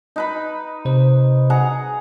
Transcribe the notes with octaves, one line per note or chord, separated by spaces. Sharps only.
D#4 B4 B5
C3 C5
G#4 F#5 A#5